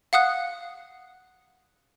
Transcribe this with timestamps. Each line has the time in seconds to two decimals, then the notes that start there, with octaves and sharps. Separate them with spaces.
0.13 F5 F#5 D#6 F#6